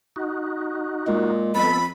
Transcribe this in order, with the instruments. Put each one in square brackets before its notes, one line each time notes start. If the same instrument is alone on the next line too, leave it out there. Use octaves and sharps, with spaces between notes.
[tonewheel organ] D#4 F#4
[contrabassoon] A#2 [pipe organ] G#3
[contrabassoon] F2 [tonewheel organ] B3 A4 [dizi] B5